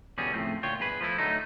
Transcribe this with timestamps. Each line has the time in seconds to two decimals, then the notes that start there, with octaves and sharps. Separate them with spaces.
0.18 E2 B2 D3 G3 C#4 G#4
0.34 A2 C#3 F3 A3 C4
0.63 D2 A#2 F4 C#5 G5
0.79 E2 G2 G#4 B4
1.01 F3 A3 E4
1.18 D3 F#3 A3 D#4